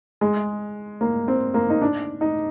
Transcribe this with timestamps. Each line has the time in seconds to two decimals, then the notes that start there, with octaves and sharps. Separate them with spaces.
0.21 G#3
1.01 A#3
1.28 C4
1.54 A#3
1.70 D#4
1.82 D4
2.21 D#4